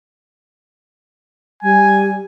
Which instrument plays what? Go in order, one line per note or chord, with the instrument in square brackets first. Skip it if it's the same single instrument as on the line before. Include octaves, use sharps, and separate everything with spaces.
[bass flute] G3 [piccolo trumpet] G#5